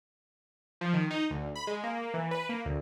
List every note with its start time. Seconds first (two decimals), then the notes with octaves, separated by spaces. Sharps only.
0.81 F3
0.94 D#3
1.10 D#4
1.30 D2
1.55 B5
1.67 G#3
1.83 A#3
2.14 E3
2.31 B4
2.49 A#3
2.65 D2